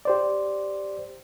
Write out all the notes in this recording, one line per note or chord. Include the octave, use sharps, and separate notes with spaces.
G4 C5 D5